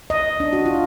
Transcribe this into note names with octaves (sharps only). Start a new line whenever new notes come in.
D#5
D4
F#4
F4